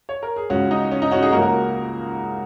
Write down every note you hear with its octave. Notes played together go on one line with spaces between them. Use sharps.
C#5
A#4
G#4
C#2 C#3 G#3 C#4 F#4
D#4
C#4
D#4
C#4 F#4
D#4 G#4
C#2 C#3 A#3 F#4 A#4
F#4 A#4